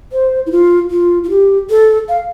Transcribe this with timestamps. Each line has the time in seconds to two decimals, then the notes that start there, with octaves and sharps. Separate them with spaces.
0.12 C5
0.46 E4
0.51 F4
0.91 F4
1.24 F4
1.30 G4
1.70 A4
2.09 F5